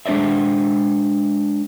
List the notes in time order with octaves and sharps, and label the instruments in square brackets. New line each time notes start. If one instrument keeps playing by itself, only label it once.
[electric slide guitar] G#3 D4 C5 D5 E5